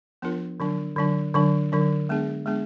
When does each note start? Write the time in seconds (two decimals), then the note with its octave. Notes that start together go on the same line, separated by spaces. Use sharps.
0.22 F3 B3 D4 F4 A#4
0.60 D3 F#3 D4
0.96 D3 F#3 D4
1.34 D3 F#3 D4
1.72 D3 F#3 D4
2.09 G#3 B3 D4 G#4
2.46 G#3 B3 D4 G#4